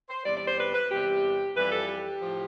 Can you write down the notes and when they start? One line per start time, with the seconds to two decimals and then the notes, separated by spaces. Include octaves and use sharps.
0.09 C5
0.25 E2 C3 G3 D5
0.36 D5
0.47 C5
0.58 B4
0.74 B4
0.90 E2 C3 G3 G4
1.56 F2 E3 G3 B4
1.72 A4
1.88 G4
2.20 A2 F3